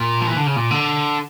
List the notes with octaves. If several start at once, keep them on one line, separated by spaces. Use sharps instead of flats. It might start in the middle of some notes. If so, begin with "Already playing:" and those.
Already playing: A#2
F3
E3
D3
C#3
A#2
D3